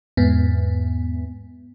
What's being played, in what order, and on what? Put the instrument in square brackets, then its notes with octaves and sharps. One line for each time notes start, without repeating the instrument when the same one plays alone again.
[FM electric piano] E2 G#2 B3